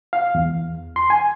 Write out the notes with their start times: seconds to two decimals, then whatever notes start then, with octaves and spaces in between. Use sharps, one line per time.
0.13 F5
0.35 E2
0.96 C6
1.10 G#5